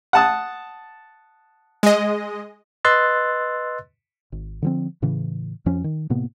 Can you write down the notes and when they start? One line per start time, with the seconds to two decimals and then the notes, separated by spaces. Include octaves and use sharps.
0.13 F#5 A5 D#6
1.83 G#3 D#5
2.85 B4 D#5 C6 E6 F#6 A6
4.32 G#1
4.62 D3 F3 C4
5.02 A2 C#3 E3
5.66 F2 F3 C#4
5.84 D#3
6.10 A2 C3 A#3 B3